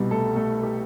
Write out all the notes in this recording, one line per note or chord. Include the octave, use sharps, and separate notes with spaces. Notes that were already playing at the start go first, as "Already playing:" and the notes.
Already playing: C2 B2 G3
A3 A4
A3 A4
G4